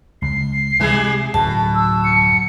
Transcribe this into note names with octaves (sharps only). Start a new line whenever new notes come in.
C#2 C7
C3 E3 G3 G#3 G#4
D1 F#2 B2 F#3 A5
E6
C#7